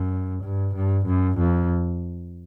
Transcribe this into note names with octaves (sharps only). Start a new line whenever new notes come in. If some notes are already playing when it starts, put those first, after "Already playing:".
Already playing: F#2
G2
G2
F#2
F2